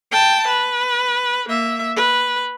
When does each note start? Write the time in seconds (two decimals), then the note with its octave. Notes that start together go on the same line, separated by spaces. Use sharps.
0.11 G5 A5
0.48 B4
1.49 A#3 E5
1.96 B4